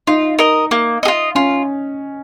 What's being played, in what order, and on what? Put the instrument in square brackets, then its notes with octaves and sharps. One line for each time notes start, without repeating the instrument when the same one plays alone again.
[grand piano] D#4 [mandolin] F4
[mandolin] A#4 D#5
A#3
G#4 D#5
F4
[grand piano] C#4 [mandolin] F4